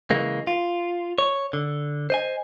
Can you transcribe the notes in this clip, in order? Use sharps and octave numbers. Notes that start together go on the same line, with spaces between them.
C#3 E3 G#3 A#3
F4
C#5
D3
C5 D#5 G#5